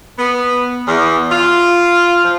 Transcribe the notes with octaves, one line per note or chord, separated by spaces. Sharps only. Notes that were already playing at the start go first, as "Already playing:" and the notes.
B3
E2
F4
F3